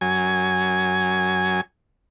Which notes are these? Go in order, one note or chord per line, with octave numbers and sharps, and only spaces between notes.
F#2 G#5